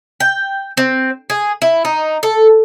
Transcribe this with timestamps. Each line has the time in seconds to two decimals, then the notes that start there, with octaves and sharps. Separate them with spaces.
0.20 G5
0.77 C4
1.30 G#4
1.62 E4
1.85 D#4
2.23 A4